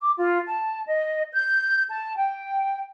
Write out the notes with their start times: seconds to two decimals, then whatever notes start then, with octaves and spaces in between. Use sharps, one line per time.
0.01 D6
0.16 F4
0.47 A5
0.85 D#5
1.33 G6
1.90 A5
2.18 G5